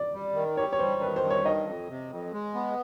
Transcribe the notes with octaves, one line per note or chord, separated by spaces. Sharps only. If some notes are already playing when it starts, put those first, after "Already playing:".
Already playing: D5
G3
D#3
G3 C#5
C#5
G2 C5
D#3 B4
C5
G2
C#5
D#3 D#5
F2
C3
F2
G#3
B3